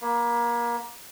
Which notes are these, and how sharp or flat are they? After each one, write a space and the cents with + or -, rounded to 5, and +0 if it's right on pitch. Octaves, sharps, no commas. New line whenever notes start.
A#3 +25 B5 +15